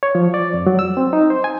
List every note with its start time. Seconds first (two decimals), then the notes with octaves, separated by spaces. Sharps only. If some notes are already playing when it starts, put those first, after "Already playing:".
0.03 C#5
0.15 F3
0.34 D5
0.54 F2
0.67 F#3
0.79 E6
0.97 C4
1.13 D#4
1.30 C5
1.44 G#5